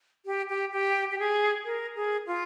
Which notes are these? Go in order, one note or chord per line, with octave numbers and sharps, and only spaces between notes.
G4
G4
G4
G4
G#4
A#4
G#4
F4